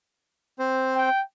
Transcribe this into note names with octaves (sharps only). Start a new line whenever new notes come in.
C4 C5
G5